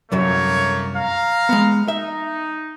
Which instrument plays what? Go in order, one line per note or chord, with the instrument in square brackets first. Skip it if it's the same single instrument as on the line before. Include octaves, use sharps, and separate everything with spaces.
[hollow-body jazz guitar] C2 F#2 F#3 [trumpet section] A3 A#3 C#5
[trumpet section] F5 A#5
[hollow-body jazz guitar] G#3 B3
[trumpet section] D#4 [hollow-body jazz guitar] E5